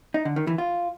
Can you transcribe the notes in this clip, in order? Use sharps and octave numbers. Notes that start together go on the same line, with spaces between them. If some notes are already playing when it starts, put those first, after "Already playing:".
D#4
D3
D#3
E3
F4